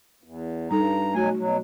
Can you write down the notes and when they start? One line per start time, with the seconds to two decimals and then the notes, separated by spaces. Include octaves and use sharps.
0.24 E2
0.71 G2 G3 D#4 A4 A#5
1.15 B2 F#3 A3 F#4 G#5
1.38 B2 F#3